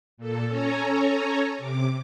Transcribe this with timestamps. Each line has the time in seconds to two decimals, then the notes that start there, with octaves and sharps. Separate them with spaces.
0.17 A#2 A4
0.48 C#4 A4 C#5 G#5 A#5
1.58 C3 D6